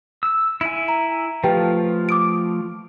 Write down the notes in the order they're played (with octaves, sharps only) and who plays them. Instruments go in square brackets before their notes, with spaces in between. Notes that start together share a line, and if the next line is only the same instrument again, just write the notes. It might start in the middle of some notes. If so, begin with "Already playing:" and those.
[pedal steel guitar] E6
E4 G#5
[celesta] A#5
[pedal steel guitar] F3 A3 F4 [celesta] G4 B4 G5
[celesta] D6 D#6 D7